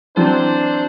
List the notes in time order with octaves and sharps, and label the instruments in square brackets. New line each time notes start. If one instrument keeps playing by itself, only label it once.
[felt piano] E3 F#3 C4 [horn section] D4 C5